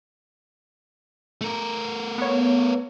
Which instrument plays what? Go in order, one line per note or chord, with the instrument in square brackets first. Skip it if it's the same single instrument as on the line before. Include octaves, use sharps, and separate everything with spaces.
[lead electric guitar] A3 A#4
[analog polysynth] B3 C#5